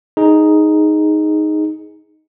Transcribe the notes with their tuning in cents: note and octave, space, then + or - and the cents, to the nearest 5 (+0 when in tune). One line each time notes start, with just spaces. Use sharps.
D#4 +0 G#4 +0